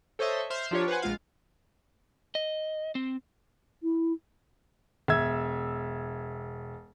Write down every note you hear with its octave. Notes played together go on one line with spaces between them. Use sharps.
A4 C5 C#5 D#5 E5
C5 E5 C6 F6 G6
F3 D4 F4 G4 A#4 C#5
B4 C5 F#5 G#5
A#1 G#3 F4 F5
D#5
C4
E4
E1 E5 E6 G#6